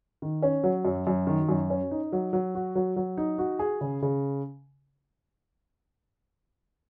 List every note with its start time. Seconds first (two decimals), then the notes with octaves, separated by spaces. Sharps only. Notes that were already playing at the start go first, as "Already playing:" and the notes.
0.22 D#3
0.43 C#4
0.64 F#3
0.85 F#2
1.07 F#2
1.27 D#3
1.49 F#2
1.70 C#4
1.91 D#4
2.12 F#3
2.33 F#3
2.55 F#4
2.75 F#3
2.96 F#3
3.17 D#4
3.38 F#4
3.59 G#4
3.81 C#3
4.02 C#3